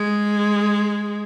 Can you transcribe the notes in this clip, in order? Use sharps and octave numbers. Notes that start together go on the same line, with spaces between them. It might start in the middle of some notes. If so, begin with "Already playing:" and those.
Already playing: G#3